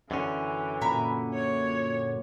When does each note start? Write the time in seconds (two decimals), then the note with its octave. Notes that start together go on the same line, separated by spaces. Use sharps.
0.11 F#2 D3 E3 C#4
0.82 A#2 E5 A#5 B5
1.34 C#5